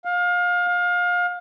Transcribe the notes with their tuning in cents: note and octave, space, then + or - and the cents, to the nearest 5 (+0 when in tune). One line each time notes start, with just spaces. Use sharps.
F5 +30
F5 +30